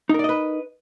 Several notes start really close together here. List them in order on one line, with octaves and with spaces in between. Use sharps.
D#4 A#4 D5 D#5 B4